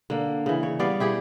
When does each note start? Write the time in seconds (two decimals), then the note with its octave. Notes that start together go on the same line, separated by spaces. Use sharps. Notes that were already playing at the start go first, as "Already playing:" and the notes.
0.10 D3 A#3
0.46 C#3 E3
0.63 C#5
0.79 G3 B3 D5 F5
1.00 E4 G4 G#4 D5